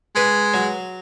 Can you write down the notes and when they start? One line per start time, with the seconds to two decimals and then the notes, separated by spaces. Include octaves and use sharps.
0.15 G#3 B4
0.54 F#3